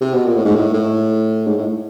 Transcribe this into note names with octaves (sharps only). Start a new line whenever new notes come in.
C3
B2
A#2
A2
G#2
A2
A2
G#2
A2